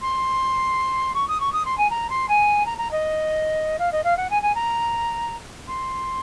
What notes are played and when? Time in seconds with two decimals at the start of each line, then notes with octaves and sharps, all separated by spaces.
0.01 C6
1.14 C#6
1.28 D#6
1.40 C#6
1.53 D#6
1.65 C6
1.78 G#5
1.90 A#5
2.10 C6
2.28 G#5
2.66 A#5
2.78 A#5
2.91 D#5
3.79 F5
3.92 D#5
4.04 F5
4.17 F#5
4.30 G#5
4.42 G#5
4.55 A#5
5.68 C6